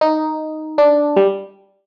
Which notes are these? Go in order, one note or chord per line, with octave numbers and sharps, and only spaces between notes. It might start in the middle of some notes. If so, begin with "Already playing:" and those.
D#4
D4
G3